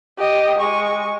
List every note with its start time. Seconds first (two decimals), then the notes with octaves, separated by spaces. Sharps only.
0.18 G4 D#5
0.59 G#3 C#6